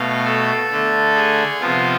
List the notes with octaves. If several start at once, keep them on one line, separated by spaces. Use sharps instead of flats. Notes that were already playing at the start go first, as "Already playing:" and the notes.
Already playing: B2 A3 F5
A4
D3 A3
G#4
C3 F3 B3 F4